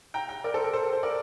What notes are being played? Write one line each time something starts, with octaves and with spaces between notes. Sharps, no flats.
G5 A#5
G5 A#5
A#4 D5
A4 C5
A#4
A4 C5
C5
A#4 D5